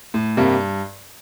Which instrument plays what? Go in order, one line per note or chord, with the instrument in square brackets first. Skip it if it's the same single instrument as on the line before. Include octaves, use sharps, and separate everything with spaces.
[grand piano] A2
[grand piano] G2 [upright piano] C3 G3 A#3